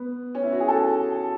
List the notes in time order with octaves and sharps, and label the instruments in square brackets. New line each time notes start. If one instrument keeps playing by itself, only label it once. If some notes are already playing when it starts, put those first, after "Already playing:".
Already playing: [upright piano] B3
C#4
E4
F#4
G#4
A4